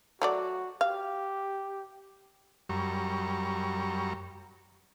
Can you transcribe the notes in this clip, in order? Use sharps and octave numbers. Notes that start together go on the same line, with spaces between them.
F#3 A3 F#4 D5
G4 F5
F#2 G3 A#5 C#6